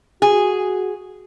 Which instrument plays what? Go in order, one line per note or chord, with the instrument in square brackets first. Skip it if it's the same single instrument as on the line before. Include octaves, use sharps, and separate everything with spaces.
[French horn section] F#4 [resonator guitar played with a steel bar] G#4